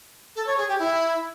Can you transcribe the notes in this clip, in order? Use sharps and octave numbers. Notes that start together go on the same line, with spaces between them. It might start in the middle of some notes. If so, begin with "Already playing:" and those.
A4
C#5
G#4
G4
E4